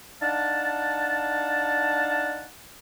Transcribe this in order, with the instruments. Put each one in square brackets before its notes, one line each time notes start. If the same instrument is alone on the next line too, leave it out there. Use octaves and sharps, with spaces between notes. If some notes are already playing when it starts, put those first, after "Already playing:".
[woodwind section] D4 D#4 F5 F#5 A5